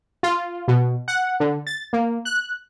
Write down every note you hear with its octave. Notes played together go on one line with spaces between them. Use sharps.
F4
B2
F#5
D3
A6
A#3
F#6